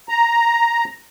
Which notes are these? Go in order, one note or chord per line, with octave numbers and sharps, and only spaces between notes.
A#5